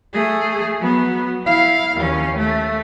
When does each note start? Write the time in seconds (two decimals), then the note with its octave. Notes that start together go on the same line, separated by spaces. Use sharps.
0.14 A3 G#4
0.79 F#3 B3
1.46 E4 F5
1.96 D#2 C#4
2.38 A3